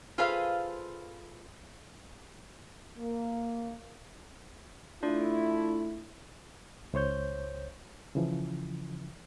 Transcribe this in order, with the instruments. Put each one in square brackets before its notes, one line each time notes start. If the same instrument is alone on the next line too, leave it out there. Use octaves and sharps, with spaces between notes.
[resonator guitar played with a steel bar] F4 G#4 A4 B4 C5 F5
[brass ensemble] A#3
[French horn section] A3 E4 [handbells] D4 F4 D5
[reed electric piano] C#2 C5 C#5 G6
C#3 E3 F3